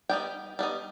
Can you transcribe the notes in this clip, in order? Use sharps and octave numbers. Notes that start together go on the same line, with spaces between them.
G3 B3 D#4 G5
G3 B3 D#4